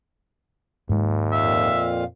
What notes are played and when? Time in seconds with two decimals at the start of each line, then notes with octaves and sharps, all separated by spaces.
0.89 D#2 G#2 G#3
1.32 F2 A#2 E5 F5